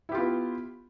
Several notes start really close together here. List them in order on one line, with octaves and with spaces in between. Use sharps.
E4 G4 F4 B3